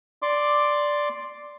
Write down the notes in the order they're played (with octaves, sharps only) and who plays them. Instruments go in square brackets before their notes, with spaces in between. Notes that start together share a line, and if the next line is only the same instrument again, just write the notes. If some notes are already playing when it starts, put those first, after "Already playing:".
[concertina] D5 C6 D6